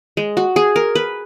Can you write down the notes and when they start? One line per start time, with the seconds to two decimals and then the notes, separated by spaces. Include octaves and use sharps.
0.17 G#3
0.37 F#4
0.56 G#4
0.76 A#4
0.95 B4